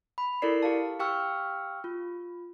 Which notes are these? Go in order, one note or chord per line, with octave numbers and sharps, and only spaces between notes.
B5
E4 A4 A#4 D5 C7
G4 F5 A5
G4 F5 G5 C#6 E6 F6
F4